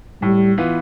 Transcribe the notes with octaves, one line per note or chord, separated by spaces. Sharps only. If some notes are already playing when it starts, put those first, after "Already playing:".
A2 G3
E3 B3 F4